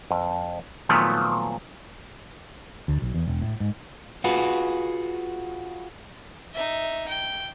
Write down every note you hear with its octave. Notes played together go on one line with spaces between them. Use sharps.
F2
A#2 D#3 F3 F#3 A3 B3
D2
B1
E2
E1
A2
G#2
F4 F#4 G#4 B4
D#4 E5
G5